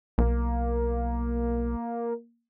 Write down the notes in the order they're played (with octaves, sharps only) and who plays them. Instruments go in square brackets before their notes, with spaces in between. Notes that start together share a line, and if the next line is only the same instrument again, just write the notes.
[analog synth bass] B1 [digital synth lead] A#3